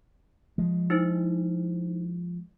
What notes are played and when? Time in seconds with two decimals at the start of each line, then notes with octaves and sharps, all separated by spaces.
0.58 F3 G#3
0.90 D#4 E4 C5